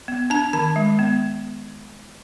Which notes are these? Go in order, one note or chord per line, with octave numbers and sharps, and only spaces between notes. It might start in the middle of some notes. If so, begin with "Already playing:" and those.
B3
D4 A#5
D#3 A5
G#3
B3